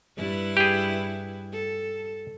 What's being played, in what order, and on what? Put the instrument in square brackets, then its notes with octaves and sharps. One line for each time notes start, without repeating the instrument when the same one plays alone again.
[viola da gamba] G2 E4 B4
[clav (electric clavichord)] G4 G#4
[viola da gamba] A4